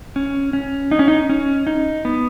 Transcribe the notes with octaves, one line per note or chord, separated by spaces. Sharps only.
C#4
C#4
D#4
C#4
D#4
C#4
D#4
B3